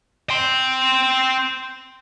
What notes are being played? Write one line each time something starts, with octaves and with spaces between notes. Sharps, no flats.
G5 C6